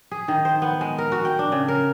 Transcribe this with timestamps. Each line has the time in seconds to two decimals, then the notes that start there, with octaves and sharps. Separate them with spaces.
0.11 G#4
0.28 D#3
0.45 C5
0.62 B3
0.81 G#3
0.98 A#4
1.12 F#4
1.25 G5
1.39 D4
1.52 C#3
1.68 A#4